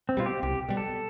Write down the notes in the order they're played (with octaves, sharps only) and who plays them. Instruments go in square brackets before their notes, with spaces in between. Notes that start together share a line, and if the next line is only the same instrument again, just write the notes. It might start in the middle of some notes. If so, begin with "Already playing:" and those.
[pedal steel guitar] C4
[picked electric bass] B2 G3 [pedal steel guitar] F4
[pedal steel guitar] G4
[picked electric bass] C2 [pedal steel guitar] G4
[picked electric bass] B2 G3
[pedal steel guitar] A4